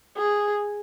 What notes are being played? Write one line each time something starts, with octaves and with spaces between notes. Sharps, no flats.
G#4